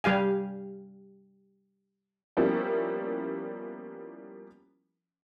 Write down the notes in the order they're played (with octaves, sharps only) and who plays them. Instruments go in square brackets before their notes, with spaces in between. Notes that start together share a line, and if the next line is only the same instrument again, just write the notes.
[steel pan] G3 G4 F5 G#5
[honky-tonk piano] F3 G3 A#3 B3 C#4 E4